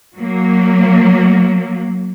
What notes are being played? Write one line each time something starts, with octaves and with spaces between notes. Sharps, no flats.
F#3 A#3